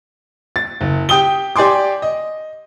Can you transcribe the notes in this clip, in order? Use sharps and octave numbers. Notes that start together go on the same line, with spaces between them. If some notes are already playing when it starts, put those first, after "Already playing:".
A6
F#1
G4 G5 D#6 G7
G4 D5 G#5 C6 D6
D#5